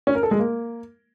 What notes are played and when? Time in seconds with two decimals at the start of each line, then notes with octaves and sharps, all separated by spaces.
0.07 C#4
0.15 A#4
0.23 A4
0.31 G#3
0.39 A#3